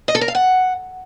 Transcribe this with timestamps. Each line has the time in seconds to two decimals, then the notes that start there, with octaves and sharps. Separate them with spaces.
0.08 D#5
0.15 A4
0.21 A#4
0.28 F5
0.35 F#5